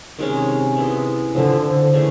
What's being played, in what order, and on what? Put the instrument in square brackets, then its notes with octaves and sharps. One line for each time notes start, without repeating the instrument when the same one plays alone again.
[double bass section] C3 [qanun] D#3 G#3 C#4
[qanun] G#3 B3 E4
[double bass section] D3 [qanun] F3 A3 C4 E4
[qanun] C#3 E3 A3